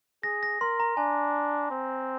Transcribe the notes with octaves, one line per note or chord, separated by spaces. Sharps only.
G#4 A#6
A#6
A#4 C6
A#5
D4 G#5
C4